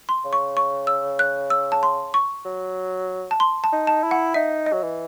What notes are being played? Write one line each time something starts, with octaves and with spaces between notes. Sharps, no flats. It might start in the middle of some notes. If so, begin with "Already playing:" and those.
C6
C#3
C#6
C#6
E6
F#6
E6
A5
C6
C#6
F#3
A5
C6
A5
D#4
A5
E4
F#5
D#4 E5
D#5
F#3
E3